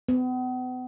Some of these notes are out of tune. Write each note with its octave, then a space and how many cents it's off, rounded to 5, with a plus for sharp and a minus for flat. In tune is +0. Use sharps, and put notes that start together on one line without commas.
B3 +40